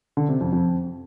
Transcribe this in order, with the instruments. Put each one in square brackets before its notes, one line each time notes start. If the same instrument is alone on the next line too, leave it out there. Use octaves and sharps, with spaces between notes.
[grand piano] D3
C3
F2
F2